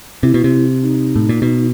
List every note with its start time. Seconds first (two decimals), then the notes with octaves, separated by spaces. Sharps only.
0.23 C3 E4
0.34 B2
0.44 C3
0.83 D#4
1.16 A2
1.29 A#2
1.42 B2